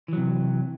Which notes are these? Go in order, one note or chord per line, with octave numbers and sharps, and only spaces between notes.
C3 E3 F#3